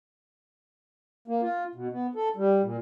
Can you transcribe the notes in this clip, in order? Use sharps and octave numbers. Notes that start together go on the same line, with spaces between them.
A#3
F4
B2
B3
A4
G3
A#2